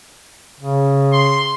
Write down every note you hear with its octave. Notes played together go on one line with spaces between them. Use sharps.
C#3
C6